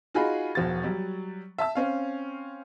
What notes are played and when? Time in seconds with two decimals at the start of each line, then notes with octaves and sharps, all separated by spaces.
0.14 D#4 F4 F#4 G#4 B5
0.55 E1 F3 F#4 A6
0.84 F#3 G3
1.58 E5 A5 E6
1.75 C4 C#4 F5